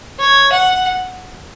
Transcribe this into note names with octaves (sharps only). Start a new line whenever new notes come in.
C#5
F#5